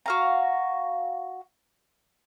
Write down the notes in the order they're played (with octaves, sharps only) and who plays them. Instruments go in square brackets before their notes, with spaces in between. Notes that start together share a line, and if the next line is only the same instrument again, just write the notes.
[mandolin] F#4 F5 A#5